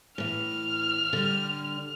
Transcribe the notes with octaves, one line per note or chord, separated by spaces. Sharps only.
A2 E3 F6
D3 G3